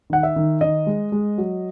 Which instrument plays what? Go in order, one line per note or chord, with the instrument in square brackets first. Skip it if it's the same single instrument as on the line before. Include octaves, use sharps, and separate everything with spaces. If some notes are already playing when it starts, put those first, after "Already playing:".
[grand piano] D#3 F#5
E5
D#3
D#3 D#5
G#3
G#3
F#3